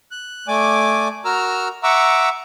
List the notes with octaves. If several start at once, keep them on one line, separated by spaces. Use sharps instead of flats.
F#6
A3 D5 G#5 D6
F#4 A#4 A#5 E6 F6
E5 F#5 A#5 C#6 D6 E6